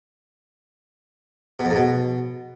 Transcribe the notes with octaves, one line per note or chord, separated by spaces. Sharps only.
B2
F2
G#2
B2